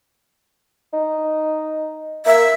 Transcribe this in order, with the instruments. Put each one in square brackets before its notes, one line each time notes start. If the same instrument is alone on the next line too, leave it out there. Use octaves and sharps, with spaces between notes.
[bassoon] D#4
[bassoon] A#3 [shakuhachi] E5